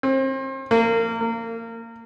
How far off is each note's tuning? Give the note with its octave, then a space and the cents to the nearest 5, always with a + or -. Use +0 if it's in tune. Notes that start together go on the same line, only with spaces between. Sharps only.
C4 +35
A#3 -25
A#3 -25